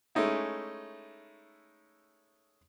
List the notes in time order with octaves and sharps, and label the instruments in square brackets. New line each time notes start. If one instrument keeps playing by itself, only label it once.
[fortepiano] G#3 A3 C#4 D#4 E4